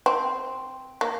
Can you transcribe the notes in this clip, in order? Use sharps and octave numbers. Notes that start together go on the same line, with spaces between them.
C4
A#3